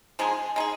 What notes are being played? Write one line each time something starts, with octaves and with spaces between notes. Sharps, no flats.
F3 G#3 D#4 G#4
G#3 D#4 G#4